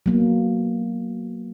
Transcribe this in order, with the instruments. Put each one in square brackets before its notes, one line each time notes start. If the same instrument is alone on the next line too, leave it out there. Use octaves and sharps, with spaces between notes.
[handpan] F#3 A#3 B3